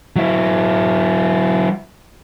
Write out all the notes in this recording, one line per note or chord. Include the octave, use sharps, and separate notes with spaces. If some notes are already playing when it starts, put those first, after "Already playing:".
F#3 E4